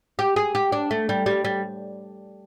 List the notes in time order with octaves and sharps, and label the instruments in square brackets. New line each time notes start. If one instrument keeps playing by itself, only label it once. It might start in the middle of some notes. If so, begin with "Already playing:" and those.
[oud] G4
G#4
G4
D4
A3
G3
G3
G3